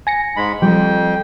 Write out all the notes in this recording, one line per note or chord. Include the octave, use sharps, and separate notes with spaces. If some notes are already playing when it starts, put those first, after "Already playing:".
G#5 A#6 C#7
G#2 G#3 B5
F2 F3 G3 G5